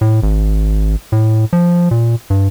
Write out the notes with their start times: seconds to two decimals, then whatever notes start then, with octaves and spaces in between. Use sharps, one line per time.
0.01 A2
0.23 G#1
1.12 A2
1.53 F3
1.91 A#2
2.30 G2